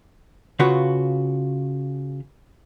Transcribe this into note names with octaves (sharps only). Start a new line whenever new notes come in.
C#3 F4 F#4 B4